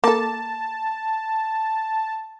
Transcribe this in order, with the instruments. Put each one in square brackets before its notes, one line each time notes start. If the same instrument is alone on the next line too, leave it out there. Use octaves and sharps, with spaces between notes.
[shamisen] A#3 A4 [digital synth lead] A5